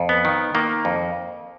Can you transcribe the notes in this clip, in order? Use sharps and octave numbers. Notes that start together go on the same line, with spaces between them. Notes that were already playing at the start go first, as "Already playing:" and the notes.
Already playing: F2
B3
D#3
D#3 A#3
F2